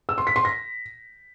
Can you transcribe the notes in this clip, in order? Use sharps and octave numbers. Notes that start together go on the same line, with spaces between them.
E6
C6
B6
C6
A#6